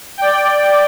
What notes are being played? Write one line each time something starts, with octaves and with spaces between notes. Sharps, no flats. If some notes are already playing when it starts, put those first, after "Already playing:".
D5 G5